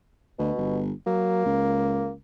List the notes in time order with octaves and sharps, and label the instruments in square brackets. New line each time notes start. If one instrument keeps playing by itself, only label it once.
[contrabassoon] D2 [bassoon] B2
[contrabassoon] G1
[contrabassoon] F#3 [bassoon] A#3
[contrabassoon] C#2